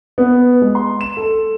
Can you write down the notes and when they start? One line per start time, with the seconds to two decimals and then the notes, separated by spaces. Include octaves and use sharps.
0.18 B3
0.62 G#3
0.75 C6
1.01 E7
1.17 A4